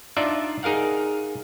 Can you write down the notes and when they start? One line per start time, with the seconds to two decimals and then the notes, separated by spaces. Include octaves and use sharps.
0.17 D4 D#4 F4 D5 E5
0.63 D#4 G#4 A#4 F5 F#5